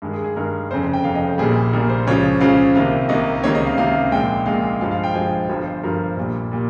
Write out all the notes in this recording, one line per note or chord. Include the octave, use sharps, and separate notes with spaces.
G2 D#3 G#3
G#4
G#4
G2 D#3 G#3 A#4
F1 F2 C#3 C5
G5
F1 F2 C#3 F5
D#5
C5
A#1 A#2 G3 G#4
A#1 A#2 G3 A#4
C5
C#2 C#3 F3 C#5
C#2 C#3 F3 F5
C2 C3 D#3 A#3 F5
C2 C3 D#3 A#3 D#5
C#2 C3 D#3 A#3 C#5
D#5
F5
C#2 C3 D#3 A#3 F5
A#1 A#2 G#3 G5
A#1 A#2 G#3 F5
G2 F3 G#3 F5
F5
G5
G2 F3 G#3 G#5
G1 G2 F3 G#5
C5
G1 G2 F3 A#4
A#1 A#2 G3
A#2 G3